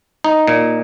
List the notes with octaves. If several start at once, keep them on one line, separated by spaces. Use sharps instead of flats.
D#4
A#2